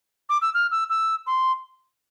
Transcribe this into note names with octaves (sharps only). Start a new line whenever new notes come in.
D6
E6
F6
E6
E6
C6